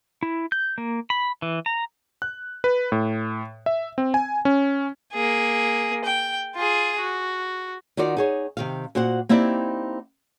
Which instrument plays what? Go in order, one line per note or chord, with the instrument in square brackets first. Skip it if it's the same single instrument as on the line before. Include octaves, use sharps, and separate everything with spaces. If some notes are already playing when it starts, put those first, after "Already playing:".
[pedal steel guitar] E4
G6
A#3
B5
E3
A#5
[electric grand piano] F#6
B4
A2
E5
C4
G#5
C#4
[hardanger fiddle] A#3 G#4
G5
F4 G#4
F#4
[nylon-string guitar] D#3 D#4 F4 F#4 D5
D#4 G#4 C#5
C3 D#3 F5
A#2 F#4 C5 F#5
A#3 C4 D#4 E4 G4 D5